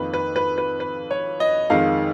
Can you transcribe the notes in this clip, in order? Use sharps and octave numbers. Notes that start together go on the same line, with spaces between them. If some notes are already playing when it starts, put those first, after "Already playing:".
Already playing: F2 D#3 A#3 B4
B4
B4
B4
B4
C#5
D#5
F2 D#3 G#3 F5